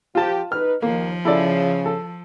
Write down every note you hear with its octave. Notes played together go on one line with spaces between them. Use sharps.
F3 F4 G4 A5
D#4 B4 F6
D#2 F3 A#3
C#3 E4 A4 D5
A4